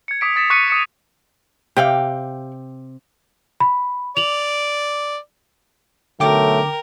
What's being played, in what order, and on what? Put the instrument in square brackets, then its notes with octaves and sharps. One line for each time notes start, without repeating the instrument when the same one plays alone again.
[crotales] G#6 C#7
D6 D#6 B6 D7
D#6 A6 B6 E7
C#6 D6 F#6 B6 C#7 D#7
D#6 C#7 E7
[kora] C3 G5 [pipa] G4 D5 F5
[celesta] B5
[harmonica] D5 [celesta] F7 F#7
[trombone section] B1 F#3 A3 [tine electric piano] D3 D6 [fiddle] A#4 [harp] G5